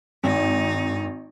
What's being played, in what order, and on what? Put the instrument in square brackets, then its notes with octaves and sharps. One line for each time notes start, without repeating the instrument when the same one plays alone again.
[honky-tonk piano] G#1 [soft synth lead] G2 [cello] D#4